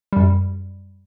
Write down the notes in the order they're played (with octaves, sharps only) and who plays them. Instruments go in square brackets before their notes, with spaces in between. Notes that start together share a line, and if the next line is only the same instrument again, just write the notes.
[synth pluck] F#2 G3